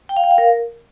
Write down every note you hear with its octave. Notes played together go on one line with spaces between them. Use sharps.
G5
F5
G5
F5
A#4